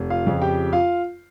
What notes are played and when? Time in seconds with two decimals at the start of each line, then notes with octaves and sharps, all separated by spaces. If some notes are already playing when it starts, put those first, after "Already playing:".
Already playing: F1
0.10 F4 F5
0.26 F2 C#3 F3
0.41 G4 G5
0.73 F4 F5